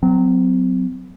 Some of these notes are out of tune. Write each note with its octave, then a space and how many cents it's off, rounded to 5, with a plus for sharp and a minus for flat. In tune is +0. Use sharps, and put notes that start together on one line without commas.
F#3 +0 C4 -35